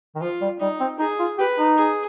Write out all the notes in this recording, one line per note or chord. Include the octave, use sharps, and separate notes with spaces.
D#3
F3 F4
G3
G3 D#4
C4
D#4 G#4
F4
G4 B4
D#4
G#4